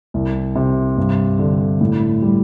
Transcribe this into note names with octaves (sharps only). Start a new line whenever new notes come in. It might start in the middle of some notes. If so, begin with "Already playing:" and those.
C2
C3
G2
D3
A2
G3